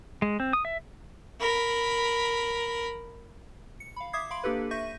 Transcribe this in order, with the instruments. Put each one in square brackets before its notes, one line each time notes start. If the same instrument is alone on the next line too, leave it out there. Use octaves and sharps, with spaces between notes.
[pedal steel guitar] G#3
C4
D#6
E5
[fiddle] A#4 B5
[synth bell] C#7
F5 B5
E5 D6 D#6 G#6 C7
F5 B5 C6 D7 F#7
A#3 D4 G4 A4 B4
E5 C#6 G6 A#6 D#7